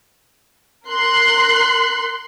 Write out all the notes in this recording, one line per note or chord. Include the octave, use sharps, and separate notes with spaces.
A#4 C6 F#6 C7